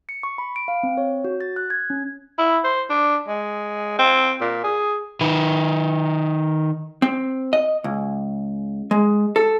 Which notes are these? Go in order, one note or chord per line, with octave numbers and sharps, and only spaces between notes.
C#7
C#6
B5
D7
F5
C4
C#5
F#4
A6
F#6
G#6
C#4
E4
C5
D4
G#3
C4
A#2
G#4
D#3 B4
C4
D#5
C#2
G#3
A4